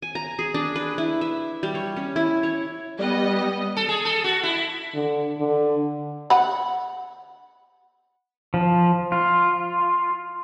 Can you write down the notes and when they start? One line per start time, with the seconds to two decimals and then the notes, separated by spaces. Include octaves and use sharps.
0.02 G#5
0.15 A#5
0.39 G#4
0.54 D4
0.76 B4
0.98 E4
1.21 E5
1.63 G3
1.75 C#5
1.96 C#4
2.16 E4
2.43 C#5
2.99 G3 B3 D#5
3.77 A4
3.89 G#4
4.05 A4
4.24 F#4
4.43 E4
4.94 D3
5.38 D3
6.30 F#5 B5
8.54 F3
9.12 F4